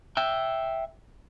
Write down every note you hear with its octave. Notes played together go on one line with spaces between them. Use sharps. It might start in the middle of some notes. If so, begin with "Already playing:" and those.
E5 G5